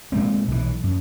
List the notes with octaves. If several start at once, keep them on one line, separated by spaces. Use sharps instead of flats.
A#2 G#3 A3 C4
B1 E3
F#2